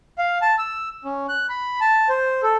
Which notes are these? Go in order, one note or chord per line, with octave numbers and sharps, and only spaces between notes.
F5
A5
E6
C#4
F#6
B5
A5
C5
A4